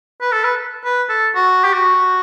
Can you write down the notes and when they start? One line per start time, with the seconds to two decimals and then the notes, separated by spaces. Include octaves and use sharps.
0.21 B4
0.32 A4
0.44 B4
0.85 B4
1.09 A4
1.35 F#4
1.64 G4
1.73 F#4